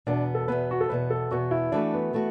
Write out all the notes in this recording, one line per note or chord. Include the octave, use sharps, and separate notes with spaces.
E2 B2 B3 D4
A4
E2 B2 B3 B4
F#4
A4
E2 B2 B3 B4
A4
E2 B2 B3 F#4
E4
E3 A3 D4 F#4 B4
B3
E3 A3 F#4